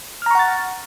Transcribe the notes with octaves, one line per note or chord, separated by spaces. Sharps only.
F#5 A#5 C#6 F6 A6